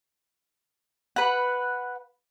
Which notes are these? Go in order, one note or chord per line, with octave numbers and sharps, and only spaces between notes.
B4 F#5